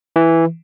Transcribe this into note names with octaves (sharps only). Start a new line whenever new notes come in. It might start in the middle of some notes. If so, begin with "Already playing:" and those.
E3